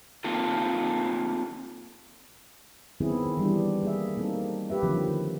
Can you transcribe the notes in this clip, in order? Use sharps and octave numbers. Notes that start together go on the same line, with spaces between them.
A#3 C4 D#4 F4 A4
D#3 F#3 B3 C4 E4 G#4
E3 G3 D4
A#3 G#4 E5
G3 A3 A#3 C4 D#4 A4
G4 B4 E5
D3 D#3 F3 F#3 A#3 C4